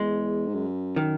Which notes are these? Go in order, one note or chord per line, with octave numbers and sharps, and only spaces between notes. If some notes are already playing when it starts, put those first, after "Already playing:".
Already playing: E2 G#3
G#2
F#2
D#3